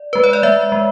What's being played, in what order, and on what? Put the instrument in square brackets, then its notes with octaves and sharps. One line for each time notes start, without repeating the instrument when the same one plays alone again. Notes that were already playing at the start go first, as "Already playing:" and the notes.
Already playing: [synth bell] D5
G#3 B4
C#5
D5
G#3 E5
G#3